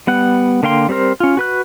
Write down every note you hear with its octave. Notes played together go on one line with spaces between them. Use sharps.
G3 B3 F#5
D3 A#3 F5 G5 C6
G3 C4 G4 A#4 C5
C#4 F4
F#4 B4 F#6